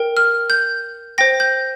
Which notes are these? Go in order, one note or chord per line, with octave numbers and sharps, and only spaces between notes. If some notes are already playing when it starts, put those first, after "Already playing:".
Already playing: A#4 G5
F6
G6
C5 G5 A#6
G6